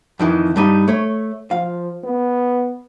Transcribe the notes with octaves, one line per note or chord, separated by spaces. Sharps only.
F2 D#3 E3
G2 G3 D#4
A3 C#5
F3 F5
B3